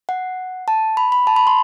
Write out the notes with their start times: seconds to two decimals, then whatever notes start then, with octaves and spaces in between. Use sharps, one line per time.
0.09 F#5
0.68 A5
0.97 B5
1.12 B5
1.27 A5
1.36 B5
1.47 C6